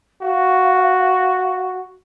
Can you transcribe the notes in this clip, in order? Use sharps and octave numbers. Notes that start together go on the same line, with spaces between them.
F#4 F5